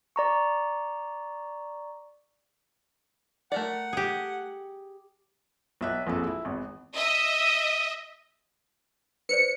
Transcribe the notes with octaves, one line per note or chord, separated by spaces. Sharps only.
D5 A#5 C#6
A3 A#4 D5 F#5
G4 G#4
B1 E5 F#6
A#1 F2 G#2 A4
E4
G#1 E2
D#5 E5
B4 C5 D5 C#7